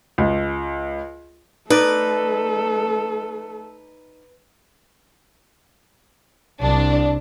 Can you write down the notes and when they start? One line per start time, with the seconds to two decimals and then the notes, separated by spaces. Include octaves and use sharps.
0.18 C#2
1.70 A3 D#4 A4 B4 D5
6.60 C2 D4